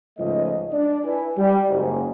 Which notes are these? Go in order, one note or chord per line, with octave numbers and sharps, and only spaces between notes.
C#2 G#2 F3 A3 D#5
D4 D5
E4 B4 G#5
G3
F#1 G#2